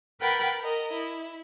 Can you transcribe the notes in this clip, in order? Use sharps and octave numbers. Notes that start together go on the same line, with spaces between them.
A#4 B4 F#5 G5 B5 A6
A#4 D#5
E4